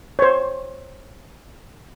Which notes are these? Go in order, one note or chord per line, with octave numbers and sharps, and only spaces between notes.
C5 C#5